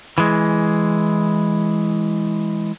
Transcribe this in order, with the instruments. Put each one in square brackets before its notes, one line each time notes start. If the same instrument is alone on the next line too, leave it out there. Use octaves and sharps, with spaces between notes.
[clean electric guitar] E3 G#3